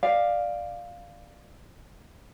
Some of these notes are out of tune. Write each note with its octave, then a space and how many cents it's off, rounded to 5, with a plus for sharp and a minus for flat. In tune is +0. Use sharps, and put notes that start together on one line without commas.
D5 +15 F5 +0